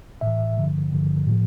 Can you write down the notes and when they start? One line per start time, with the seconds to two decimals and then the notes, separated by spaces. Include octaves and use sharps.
0.21 A2 E3 E5
0.57 G2 D3 F3
0.92 G2 D3 F3
1.27 A2 F3